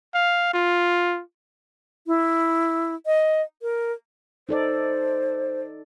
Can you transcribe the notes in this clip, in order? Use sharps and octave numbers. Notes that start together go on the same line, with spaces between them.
F5
F4
E4
D#5
A#4
D#4 A4 C5 D5